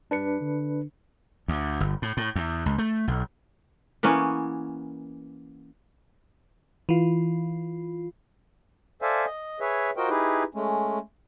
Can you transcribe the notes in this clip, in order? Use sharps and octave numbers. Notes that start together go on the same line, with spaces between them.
G2 D4 B4 C#7
D3
D2
G1
A2
A2
E2
C#2
A3
B1
E3 A#3 B3 C#4
E3 F4
A4 C5 D5 E5 F5 G#5
D#5
G#4 B4 C#5 E5
F4 F#4 A#4 C5 D#5 G5
D#4 E4 G4 G#4 B4
G#3 A3 C#4